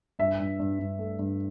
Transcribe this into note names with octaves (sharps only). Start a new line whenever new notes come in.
G2 E5
G2
G2
G2
A3
G2